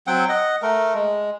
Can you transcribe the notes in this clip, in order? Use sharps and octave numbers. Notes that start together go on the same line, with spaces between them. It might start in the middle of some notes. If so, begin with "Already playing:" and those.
F#3 C4 F#5 G5
D#5 F#5
A3 A#4
G#3